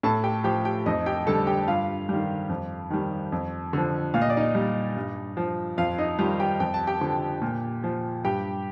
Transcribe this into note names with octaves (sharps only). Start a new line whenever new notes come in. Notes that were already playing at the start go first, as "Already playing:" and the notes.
A2 A4 A5
G4 G5
F3 G4 G5
G4 G5
F2 D#4 D#5
G4 G5
D3 G3 A4 A5
G4 G5
G2 F4 F5
D#3 G3
F2
D#3 G3
F2
D3 F3
A#2 F5
D#5
D5
D#4 D#5
G3
G2
F3
F2 F4 F5
D#4 D#5
D#3 G3 F4 F5
G4 G5
F2 G5
A5
G4 G5
D3 F3
A#2
F3
G2 G4 G5